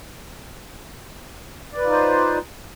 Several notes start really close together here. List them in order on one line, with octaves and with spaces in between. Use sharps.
D5 B4 F4 D#4 C5